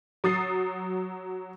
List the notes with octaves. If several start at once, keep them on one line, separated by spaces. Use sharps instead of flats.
F#3 D#6 A6 C7